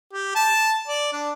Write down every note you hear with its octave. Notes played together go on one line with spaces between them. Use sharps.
G4
A5
D5
D4